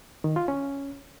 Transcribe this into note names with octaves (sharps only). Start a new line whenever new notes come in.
D#3
F4
C#4